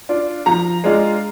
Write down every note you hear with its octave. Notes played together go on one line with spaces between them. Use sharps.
D4 F4
F3 A#5
G#3 D4 F4